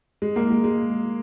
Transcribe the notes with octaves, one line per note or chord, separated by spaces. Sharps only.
G#3
A#3
G#3
G#3